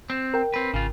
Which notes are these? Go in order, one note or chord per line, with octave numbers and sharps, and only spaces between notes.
C4
A#4 G5
C4 B4
G#1 C#3 F4